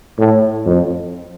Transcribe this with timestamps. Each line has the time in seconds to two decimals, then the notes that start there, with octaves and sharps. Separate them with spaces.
0.19 A2
0.66 F2